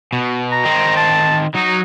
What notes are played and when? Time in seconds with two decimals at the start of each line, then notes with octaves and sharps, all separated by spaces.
0.13 B2
0.52 A#5
0.65 D#3 C4
0.97 A5
1.54 F#3 D#4